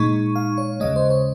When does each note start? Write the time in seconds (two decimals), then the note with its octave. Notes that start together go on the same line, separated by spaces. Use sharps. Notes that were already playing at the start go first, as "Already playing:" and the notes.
Already playing: A#2 G#3 D#4 C#6
0.36 F5
0.58 C#5
0.80 D#2 C#3 G#3 D#5
0.96 C5
1.10 C#5